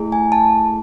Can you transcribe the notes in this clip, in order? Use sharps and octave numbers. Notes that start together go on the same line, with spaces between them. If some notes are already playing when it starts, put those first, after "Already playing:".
Already playing: A3 E4 G#4
G#5
A5